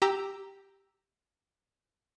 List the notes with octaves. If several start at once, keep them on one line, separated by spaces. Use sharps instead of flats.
G4 A#5 E6